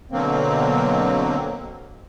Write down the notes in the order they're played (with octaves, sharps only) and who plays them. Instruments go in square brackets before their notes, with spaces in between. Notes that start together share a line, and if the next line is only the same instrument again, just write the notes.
[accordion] B2 D3 F#3 A#3 C4